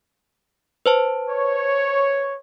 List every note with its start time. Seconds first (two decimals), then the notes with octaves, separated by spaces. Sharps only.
0.86 B4 C5 A5
1.30 C#5